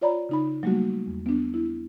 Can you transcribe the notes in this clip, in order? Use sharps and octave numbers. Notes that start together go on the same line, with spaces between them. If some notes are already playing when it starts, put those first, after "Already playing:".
F4 C#5 D5 A#5 B5
C#3 D#4 B5
F#3 G3 A3 A#3 F#4
E2
B3 D4
E4